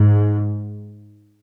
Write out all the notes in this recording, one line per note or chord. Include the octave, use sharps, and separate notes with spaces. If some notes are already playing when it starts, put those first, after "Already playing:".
Already playing: G#2